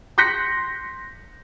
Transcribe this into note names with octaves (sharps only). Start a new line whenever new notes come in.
C6 F#6 G6 A#6 B6 C#7